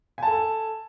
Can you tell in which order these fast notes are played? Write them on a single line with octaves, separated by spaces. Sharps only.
G#5 A5 A4